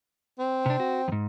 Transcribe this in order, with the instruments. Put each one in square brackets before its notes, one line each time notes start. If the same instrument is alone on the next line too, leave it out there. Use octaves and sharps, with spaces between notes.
[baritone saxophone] C4
[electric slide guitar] C3 D4
F#4
E2 G#2